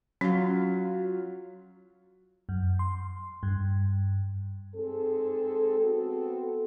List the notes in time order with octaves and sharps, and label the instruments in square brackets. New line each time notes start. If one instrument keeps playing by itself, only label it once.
[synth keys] F#3 F4 [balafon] C#4
[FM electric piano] F#2
C6
G2
[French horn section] G#2 C4 G#4 A4
B3 C4 F#4 A4